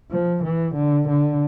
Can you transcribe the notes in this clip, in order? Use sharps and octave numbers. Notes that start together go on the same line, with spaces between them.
F3
E3
D3
D3